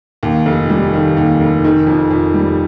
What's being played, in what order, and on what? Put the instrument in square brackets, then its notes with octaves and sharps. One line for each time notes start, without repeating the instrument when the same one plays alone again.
[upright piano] D#2
F1
G3
D#3
D#2
F1
D#3
F2
F2
G3